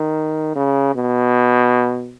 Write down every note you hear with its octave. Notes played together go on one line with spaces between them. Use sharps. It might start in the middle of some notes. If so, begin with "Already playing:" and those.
Already playing: D#3
C#3
B2